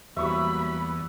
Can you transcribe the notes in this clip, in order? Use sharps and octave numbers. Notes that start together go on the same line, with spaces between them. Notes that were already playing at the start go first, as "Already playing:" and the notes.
E2 F#3 G3 A#3 E5 B5 C#6 D#6